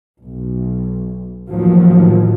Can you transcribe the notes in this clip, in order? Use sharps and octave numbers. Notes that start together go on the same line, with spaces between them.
B1
A1 D#2 A2 D#3 F3 F#3